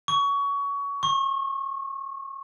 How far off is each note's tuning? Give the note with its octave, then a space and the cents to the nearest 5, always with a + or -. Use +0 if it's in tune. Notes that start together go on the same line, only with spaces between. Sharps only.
C#6 +25
C#6 -35